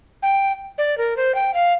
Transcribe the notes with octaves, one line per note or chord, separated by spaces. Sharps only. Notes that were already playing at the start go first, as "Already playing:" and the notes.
G5
D5
A#4
C5
G5
F5